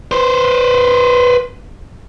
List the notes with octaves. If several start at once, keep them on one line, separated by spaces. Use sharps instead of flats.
B4 C5